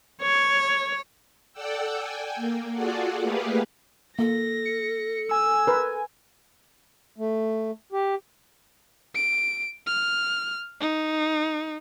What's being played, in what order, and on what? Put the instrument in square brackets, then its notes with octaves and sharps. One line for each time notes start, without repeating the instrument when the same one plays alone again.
[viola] C#5
[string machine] A4 D5 F#5 G5 E6
G5 G#5
A#3
F4 F#4 G#4 A4 D5 F#5
A3 A#3 G4 G#4 B4 F5
[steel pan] A#3 [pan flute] A4 [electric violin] A#6
[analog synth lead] C#7
[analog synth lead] G#5 [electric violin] E6
[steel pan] A#4 B4
[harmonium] A3
G4
[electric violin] D7
F6
D#4